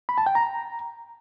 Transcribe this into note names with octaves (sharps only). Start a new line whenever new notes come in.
B5
A5
G5
A#5